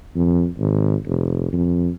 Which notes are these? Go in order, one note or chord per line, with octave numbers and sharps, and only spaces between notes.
F2
G#1
F1
F2